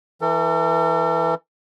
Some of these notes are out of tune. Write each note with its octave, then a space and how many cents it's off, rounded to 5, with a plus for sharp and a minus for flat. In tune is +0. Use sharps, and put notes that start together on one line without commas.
E3 +0 A4 +45